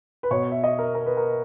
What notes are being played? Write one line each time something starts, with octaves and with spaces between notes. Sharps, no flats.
B4
B2 C#5
E5
D#5
A#4
A#4
B4
A#4